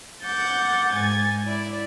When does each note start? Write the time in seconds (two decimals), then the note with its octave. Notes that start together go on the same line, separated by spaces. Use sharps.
0.23 F#5 D6 G6 A6
0.91 G#2 G#5 A6
1.45 E4 D5